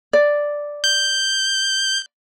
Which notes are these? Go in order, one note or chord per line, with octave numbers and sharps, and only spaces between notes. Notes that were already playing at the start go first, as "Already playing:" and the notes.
D5
G6